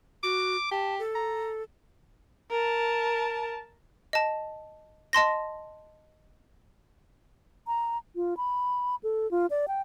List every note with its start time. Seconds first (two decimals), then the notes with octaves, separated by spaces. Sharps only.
0.23 F#4 D6
0.71 G4 A5
0.99 A4
1.15 A#5
2.51 A#4 A5
4.13 D#5 A5
5.13 D#5 A5 C6 A#6
7.67 A#5
8.16 F4
8.37 B5
9.03 A4
9.31 F4
9.50 D5
9.68 G5